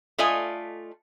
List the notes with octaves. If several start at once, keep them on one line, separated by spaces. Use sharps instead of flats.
A3 F4 D5 D#5 G#5